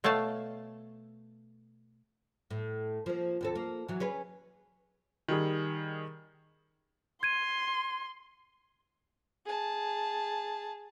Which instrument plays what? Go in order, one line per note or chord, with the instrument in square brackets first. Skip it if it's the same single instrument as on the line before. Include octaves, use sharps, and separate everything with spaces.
[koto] B2 A3 C#5 F5 A5
[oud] A2
F3 A#3
D#2 C4 A4
A#3
E3 F#3
C#4 G#4 B4
[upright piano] D#3 G3 G#4
[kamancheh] C6 [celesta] G#6 D#7
[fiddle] G#4 A5